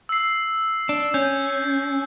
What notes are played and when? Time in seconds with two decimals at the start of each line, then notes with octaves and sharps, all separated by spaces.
0.09 E6 C7
0.89 D4
1.14 C#4 G6